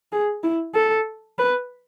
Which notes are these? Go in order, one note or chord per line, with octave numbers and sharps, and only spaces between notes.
G#4
E4
A4
B4